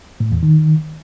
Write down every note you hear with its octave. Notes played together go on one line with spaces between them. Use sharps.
A2
E2
D#3